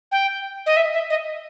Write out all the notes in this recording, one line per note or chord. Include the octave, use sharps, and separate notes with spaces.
G5
D#5
E5
E5
D#5